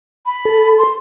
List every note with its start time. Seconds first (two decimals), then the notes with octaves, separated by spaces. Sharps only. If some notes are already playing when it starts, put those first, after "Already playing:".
0.26 B5
0.45 A4
0.78 C6